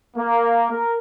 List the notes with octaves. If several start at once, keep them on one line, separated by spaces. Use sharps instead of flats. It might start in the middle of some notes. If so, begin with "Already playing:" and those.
A#3
A#4